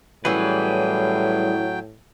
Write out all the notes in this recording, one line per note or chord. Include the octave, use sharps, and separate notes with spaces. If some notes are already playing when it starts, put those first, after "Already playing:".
A2 E3 F#3 G3 C#4 G#4 B4 G5